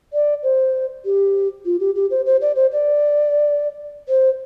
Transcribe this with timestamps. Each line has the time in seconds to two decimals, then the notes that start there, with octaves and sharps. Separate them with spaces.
0.13 D5
0.43 C5
1.05 G4
1.66 F4
1.80 G4
1.96 G4
2.11 C5
2.26 C5
2.42 D5
2.56 C5
2.72 D5
4.09 C5